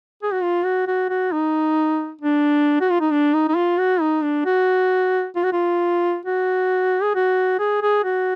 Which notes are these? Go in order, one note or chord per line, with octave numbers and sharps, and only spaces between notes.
G#4
F#4
F4
F#4
F#4
F#4
D#4
D4
F#4
F4
D#4
D4
D#4
D#4
F4
F#4
D#4
D4
F#4
F4
F#4
F4
F#4
G#4
F#4
G#4
G#4
F#4